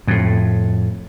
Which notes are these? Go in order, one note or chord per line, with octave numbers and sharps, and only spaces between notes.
F2 A2